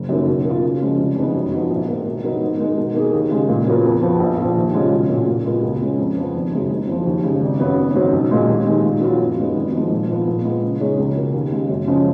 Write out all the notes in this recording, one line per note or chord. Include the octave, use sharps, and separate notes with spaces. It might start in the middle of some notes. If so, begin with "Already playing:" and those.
Already playing: F#1
F#2 D#3 A#3
B2
A#3 F4
C#3
F3 G#3 C#4
F1
F2 D#3 G#3 B3
F#2
F3 B3 D#4 F#4
A#1
G#2 D#3 A#3 D#4
B2
F#3 B3 D#4 A#4
G#2
D#3 G#3 D#4 A#4
B2
A#3 D#4 G#4
D#2
C#3 G#3
A#2
F#3 B3 F4 A#4
F2
F3 B3
A#1
A#2 F3
D#2
C#3 G#3 C#4 F4
B1
A#2 F#3
A#2
G#3 B3 F4 A#4
C#2
C#3 G#3 C#4
F2
F3 B3
G#1
F#2 C#3 G#3 D#4
F#1
F2 F3
D#2
C#3 G#3
G#1
F#2 C#3 F#3 B3
G#1
G#2 F#3 C#4
B1
A#2 G#3
D#2
D#3 G#3
A#2
F#3 B3 F4
F#2
D#3 G#3 B3
G#1
G#2 F3 G#3
A#2
F3 B3 F4
A#2
G#3 B3 F4
C#3
G#3 D#4 G#4 C#5
C#2
B2 A#3
D#2
C#3 G#3
F#2
C#3 F3 G#3 C#4